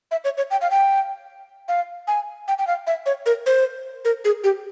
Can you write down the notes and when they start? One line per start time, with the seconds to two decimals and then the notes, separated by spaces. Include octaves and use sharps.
0.11 E5
0.24 C#5
0.38 C#5
0.51 G5
0.61 F5
0.71 G5
1.68 F5
2.08 G#5
2.48 G5
2.59 G5
2.67 F5
2.87 E5
3.06 C#5
3.26 A#4
3.46 C5
4.05 A#4
4.25 G#4
4.44 G4